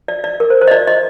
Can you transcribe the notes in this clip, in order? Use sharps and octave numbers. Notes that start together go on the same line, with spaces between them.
D5
D5
A#4
C5
C5
D#5
D5
D#5